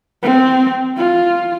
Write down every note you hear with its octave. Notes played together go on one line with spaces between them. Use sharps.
C4
F4